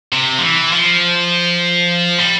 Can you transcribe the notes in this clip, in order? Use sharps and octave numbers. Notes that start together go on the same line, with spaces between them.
C3
F3
E3
F3
G3